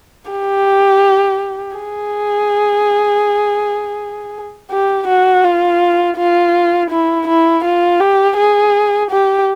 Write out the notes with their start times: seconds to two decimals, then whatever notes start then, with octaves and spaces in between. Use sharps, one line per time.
0.31 G4
1.77 G#4
4.71 G4
5.08 F#4
5.44 F4
6.17 F4
6.91 E4
7.28 E4
7.64 F4
8.01 G4
8.37 G#4
9.11 G4